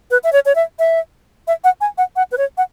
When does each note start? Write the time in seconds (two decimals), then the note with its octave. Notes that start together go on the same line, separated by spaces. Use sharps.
0.11 B4
0.24 E5
0.33 C#5
0.46 C#5
0.55 E5
0.79 E5
1.47 E5
1.64 F#5
1.81 G#5
1.98 F#5
2.16 F#5
2.32 B4
2.38 C#5
2.58 F#5